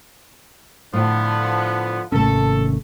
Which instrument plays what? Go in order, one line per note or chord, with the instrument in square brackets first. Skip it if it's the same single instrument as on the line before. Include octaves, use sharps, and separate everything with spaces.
[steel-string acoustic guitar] A2 [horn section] D3 F3 B3
[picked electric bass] G#1 C3 C#4 [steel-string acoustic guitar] D#2 A3 [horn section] A4